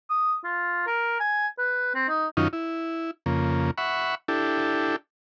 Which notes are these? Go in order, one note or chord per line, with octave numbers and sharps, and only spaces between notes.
D#6
F4
A#4
G#5
B4
C4
D#4
F#2 D#3 C#4 D#4 F4
E4
F2 C#3 A#3
E5 F#5 B5 C#6
D4 E4 G4 A4